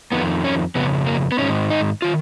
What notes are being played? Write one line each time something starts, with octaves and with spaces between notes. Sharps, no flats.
F2 D#3 B3
C#4
F2 C#3 B3
A#3
B3
G#2 D#3 C#4
D#4
D#3 F4